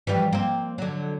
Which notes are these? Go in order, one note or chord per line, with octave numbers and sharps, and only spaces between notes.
E3 F3 G3
A#3 C4
D3 F#3